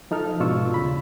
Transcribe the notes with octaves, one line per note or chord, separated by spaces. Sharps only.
F3 D#4 A4 F6
G#2 B2 D4 F4 C#6 E6
D#2 C#3 B5